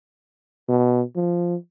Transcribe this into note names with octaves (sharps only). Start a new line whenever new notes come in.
B2
F3